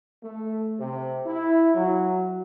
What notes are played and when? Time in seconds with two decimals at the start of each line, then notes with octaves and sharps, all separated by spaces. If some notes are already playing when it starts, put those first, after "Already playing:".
0.23 A3
0.79 C3
1.25 E4
1.75 F#3